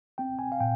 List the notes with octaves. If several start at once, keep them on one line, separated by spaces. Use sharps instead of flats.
C4 G5
G#5
F5
A#2 G5